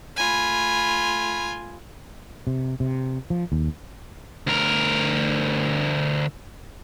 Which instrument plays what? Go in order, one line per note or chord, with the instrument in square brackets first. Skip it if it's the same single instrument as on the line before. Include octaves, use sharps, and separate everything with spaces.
[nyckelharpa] A3 B5 [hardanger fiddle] F4 G#5
[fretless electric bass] C3
C3
F3
D#2
[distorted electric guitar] D2 A#4